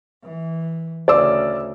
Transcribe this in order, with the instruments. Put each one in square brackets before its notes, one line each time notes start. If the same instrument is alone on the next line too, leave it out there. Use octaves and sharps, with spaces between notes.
[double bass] E3
[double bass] D2 C#3 [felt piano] D5 E6